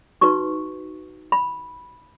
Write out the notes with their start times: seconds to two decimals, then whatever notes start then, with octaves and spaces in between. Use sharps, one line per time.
0.21 D#4 F#4 B4 C#6
1.32 B5